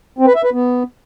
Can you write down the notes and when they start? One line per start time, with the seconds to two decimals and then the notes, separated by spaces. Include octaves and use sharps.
0.18 C4
0.27 B4
0.36 E5
0.44 B4
0.53 B3